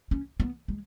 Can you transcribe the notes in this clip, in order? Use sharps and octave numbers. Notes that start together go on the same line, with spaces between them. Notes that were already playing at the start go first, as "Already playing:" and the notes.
C#4
B3
G#3